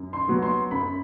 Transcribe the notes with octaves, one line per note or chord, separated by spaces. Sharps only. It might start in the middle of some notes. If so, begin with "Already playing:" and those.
Already playing: F#2
C6
F#3 B3
C6
F#2 B5